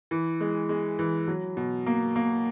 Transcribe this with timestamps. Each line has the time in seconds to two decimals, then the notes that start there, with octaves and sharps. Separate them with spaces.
0.11 E3
0.41 G#3
0.69 G#3
0.99 E3
1.28 F#3
1.57 B2
1.86 A#3
2.16 A#3